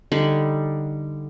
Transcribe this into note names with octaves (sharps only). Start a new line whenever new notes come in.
D3 G3 D#4